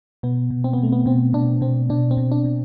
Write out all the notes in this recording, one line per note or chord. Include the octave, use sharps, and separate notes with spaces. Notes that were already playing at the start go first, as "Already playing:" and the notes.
B2 B3
B2
C4
B3
B2
A3
B3
B2 C4
B2 D4
B2 C4
B2 D4
C4
B2
D4
B2